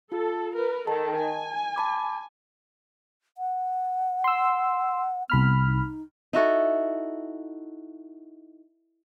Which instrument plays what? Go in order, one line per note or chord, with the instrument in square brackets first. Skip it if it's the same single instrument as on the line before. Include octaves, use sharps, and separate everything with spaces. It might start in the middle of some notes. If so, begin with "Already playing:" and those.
[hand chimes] F4 [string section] A4
[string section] A#4 B4
[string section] D#3 A4 [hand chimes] A5
[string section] G#5
[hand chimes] A5 B5 D6
[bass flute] F#5
[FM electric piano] C6 E6
[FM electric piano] C2 B5 F6 [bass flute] B3
[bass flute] D#4
[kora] D#4 E4 F#4 A4